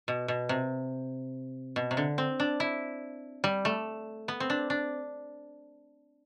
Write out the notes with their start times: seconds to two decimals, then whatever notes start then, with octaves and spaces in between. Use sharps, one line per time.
0.08 B2
0.28 B2
0.49 C3
1.76 B2
1.91 C3
1.97 D3
2.18 C4
2.40 D4
2.60 E4
3.44 G3
3.65 A3
4.28 B3
4.40 C4
4.50 D4
4.70 D4